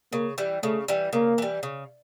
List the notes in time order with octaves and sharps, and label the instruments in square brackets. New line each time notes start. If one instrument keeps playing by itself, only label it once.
[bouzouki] C#3 [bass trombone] A#3
[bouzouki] E3 G3
[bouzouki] C#3 [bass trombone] A3
[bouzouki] E3 G3
[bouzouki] C#3 [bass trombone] A#3
[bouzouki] E3 G3
C#3